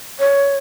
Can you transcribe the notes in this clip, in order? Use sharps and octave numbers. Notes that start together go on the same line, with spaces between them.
C#5